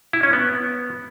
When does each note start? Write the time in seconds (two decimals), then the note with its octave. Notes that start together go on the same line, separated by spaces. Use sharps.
0.13 E4
0.23 C#4
0.33 B3